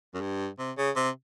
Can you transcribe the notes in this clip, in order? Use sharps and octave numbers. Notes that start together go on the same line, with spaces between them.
F#2
G2
C3
C#3
C3